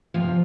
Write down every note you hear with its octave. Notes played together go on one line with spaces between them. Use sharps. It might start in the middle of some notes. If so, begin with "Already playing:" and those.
E2 C3 F3 F5